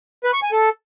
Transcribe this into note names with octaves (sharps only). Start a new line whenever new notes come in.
B4
C#6
G#5
A4